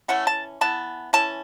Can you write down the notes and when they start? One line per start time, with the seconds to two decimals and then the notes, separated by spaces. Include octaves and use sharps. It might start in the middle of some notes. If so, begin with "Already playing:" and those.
0.08 E3 A3 C#4 F#5
0.27 A5
0.61 E3 B3 A5
1.13 E3 C#4 A5